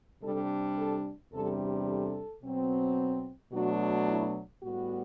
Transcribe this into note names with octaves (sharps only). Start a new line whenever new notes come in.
C3 G3 D4 A4
A4
E2 C3 G3 D4 A4
A4
B2 F#3 C4
B2 F#3 A3 D4 F#4
E4
A2 G3 B3 F#4